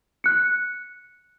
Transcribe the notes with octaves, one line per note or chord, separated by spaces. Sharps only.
F#6 C#7